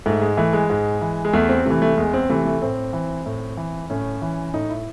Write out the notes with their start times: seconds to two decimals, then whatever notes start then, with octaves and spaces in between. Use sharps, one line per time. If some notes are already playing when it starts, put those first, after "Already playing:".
0.06 G#2 A3
0.22 G#3
0.37 E3 A3
0.53 G#3
0.70 G#2
1.02 E3
1.25 G#3
1.33 E2 A3
1.49 C4
1.65 C3 E3 A3
1.82 A3
1.97 E2 G#3
2.14 C4
2.29 C3 E3 A3
2.46 A3
2.62 A2 C4
2.93 E3
3.26 A2
3.57 E3
3.90 A2 C#4
4.22 E3
4.54 A2 D#4
4.70 E4